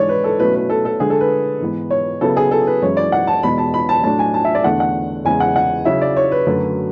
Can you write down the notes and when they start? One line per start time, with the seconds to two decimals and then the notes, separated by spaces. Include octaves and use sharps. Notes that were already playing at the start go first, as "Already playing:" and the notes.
Already playing: G#2 E3 G#3 D4 C#5 D5
0.09 B4
0.24 A4
0.39 B2 F#3 A3 C#4 E4 B4
0.55 B4
0.70 A4
0.85 A4
1.00 D3 G#3 D4 G#4
1.10 A4
1.20 B4
1.61 G#2 E3 B3
1.91 C#5
2.21 C#3 F#3 B3 E4 A4
2.37 G#4
2.51 A4
2.67 B4
2.82 F#2 E3 G#3 C#4 E4 C#5
2.97 D5
3.12 F#5
3.27 A5
3.43 E2 B2 G#3 B3 B5
3.58 A5
3.74 B5
3.89 A5
4.04 A2 F#3 A3 D4 A5
4.19 G#5
4.34 A5
4.45 E5
4.55 D5
4.64 E2 D3 A3 D4 F#5
4.80 F#5
5.25 E2 C#3 G#3 G#5
5.40 F#5
5.56 F#5
5.85 C#3 F#3 C#4 E4 E5
6.01 D5
6.17 C#5
6.32 B4
6.47 F#2 D3 F#3 A3